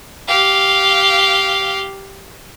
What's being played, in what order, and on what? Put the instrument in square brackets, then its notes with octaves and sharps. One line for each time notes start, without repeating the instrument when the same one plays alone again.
[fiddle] G4 F5